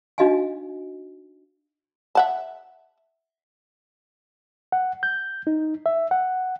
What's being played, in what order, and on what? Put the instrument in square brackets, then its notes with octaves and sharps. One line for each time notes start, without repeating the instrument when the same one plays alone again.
[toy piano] D4 D#4 F#4 D#5 F5 G#5
[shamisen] E5 F#5 A5
[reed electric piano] F#5
G6
D#4
E5
F#5